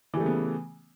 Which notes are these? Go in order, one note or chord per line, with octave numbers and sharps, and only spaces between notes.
C#3 E3 G3 A3 B3